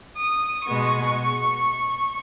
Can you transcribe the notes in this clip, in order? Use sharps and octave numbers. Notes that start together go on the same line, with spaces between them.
D#6
B2 G#3 B3 C#6